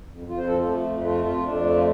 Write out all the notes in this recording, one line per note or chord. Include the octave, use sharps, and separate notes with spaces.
F2
F2 F4
C5
F3 A4
F4
A3
F2
A3 F4
F2 F4
F2 D4
A3
F4